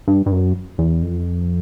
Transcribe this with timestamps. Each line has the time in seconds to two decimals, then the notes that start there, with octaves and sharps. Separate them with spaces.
0.08 G2
0.26 G2
0.32 F#2
0.78 E2
1.02 F2